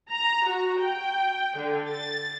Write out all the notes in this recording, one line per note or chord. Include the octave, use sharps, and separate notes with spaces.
A#5
F#4
G5
D3
A6